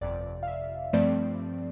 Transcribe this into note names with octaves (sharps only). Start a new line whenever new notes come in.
G1 F2 C3 D5
F5
E5
G2 F3 A3 C4 D5